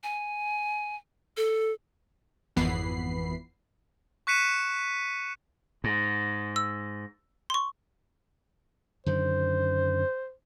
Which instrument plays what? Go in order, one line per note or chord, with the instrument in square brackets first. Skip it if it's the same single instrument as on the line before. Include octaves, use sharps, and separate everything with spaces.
[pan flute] G#5
A4
[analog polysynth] G#1 F2 E3 B3 B5 C7
[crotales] C#6 F#6 B6 C#7 D#7 E7
[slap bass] G#2
[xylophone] E6
C6 C#6
[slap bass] F#2 D3 D#3 [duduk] C5